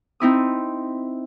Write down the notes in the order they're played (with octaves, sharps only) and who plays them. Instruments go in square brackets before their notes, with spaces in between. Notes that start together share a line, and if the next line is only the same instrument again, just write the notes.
[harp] C4 D#4 E4 D#6